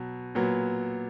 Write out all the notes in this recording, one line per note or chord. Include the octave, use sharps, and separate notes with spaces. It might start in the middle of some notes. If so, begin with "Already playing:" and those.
Already playing: B2 F#3
A#2 F#3 B3